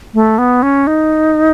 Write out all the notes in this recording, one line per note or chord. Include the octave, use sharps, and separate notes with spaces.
A3
B3
C#4
D#4